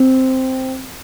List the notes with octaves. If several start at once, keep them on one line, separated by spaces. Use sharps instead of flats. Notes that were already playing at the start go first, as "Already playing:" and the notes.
Already playing: C4